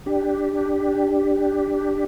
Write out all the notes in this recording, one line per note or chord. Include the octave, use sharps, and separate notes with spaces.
D4 G4